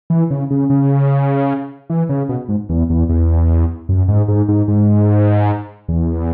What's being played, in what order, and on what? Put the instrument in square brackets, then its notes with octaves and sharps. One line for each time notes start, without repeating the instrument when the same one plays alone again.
[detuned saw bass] E3
C#3
C#3
C#3
E3
C#3
B2
G#2
E2
E2
E2
F#2
G#2
G#2
G#2
G#2
E2